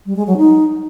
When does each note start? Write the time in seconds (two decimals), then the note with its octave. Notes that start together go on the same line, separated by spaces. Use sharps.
0.06 G3
0.16 G#3
0.27 F#3
0.37 D#4